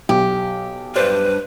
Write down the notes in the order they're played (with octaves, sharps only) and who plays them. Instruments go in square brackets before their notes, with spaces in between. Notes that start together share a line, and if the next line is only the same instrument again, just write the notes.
[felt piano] B1 [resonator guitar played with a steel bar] G4
[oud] G2 C5 D5 [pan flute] B4